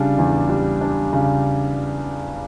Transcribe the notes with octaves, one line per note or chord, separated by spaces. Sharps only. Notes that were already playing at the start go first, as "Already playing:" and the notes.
Already playing: C#3 G3 D4
E2
G3
D4
C#3